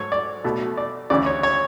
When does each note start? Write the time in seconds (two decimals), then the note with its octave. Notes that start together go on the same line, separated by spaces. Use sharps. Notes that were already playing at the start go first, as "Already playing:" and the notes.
Already playing: G#2 F#3 A3 C#5
0.12 D5
0.44 B2 A3
0.77 D5
1.10 D2 C#3 E3 D5
1.26 C#5
1.43 C#5